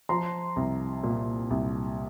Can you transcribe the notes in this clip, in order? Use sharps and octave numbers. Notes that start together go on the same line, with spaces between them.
F3 A#5 C6
C2
A#2
C2